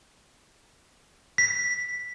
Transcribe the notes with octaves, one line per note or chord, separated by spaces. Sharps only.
B6